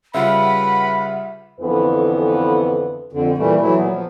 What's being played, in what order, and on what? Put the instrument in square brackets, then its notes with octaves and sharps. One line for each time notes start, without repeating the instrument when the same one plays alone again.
[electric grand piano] C#3 G3 F4 [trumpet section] B4 B5 [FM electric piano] E5 [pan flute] F#5
[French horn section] F2 D3 E3 B3 B4
[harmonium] F2 D3
A#2 E3 G3 A3
E3 F#3 A3 E4
A#2 F#3 B3
F3